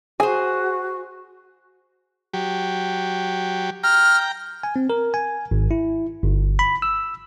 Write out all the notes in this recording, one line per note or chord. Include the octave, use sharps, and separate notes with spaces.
F#4 G#4 C5 G#5
F#3 G4
G5 A#5 F6
G#5
C4
A#4
G#5
G#1
E4
G1
B5
E6